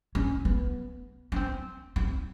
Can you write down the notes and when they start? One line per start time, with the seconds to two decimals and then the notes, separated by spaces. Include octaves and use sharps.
0.15 C#4
0.45 B3
1.32 C#4
1.36 C4
1.96 C4